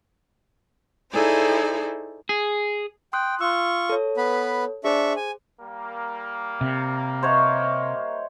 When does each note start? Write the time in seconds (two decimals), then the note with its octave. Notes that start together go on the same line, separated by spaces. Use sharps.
1.11 D#4 E4 G#4 A4 C5 D5
2.29 G#4
3.13 G5 C6 D#6 F#6
3.41 F4 C#6 E6
3.89 A4 C#5
4.17 B3 B4 B5
4.84 D4 G#4 C5 E5 C#6
5.16 G#5
5.59 G3 A#3
6.61 C3
7.23 C5 C#5 D#5 E5 F#5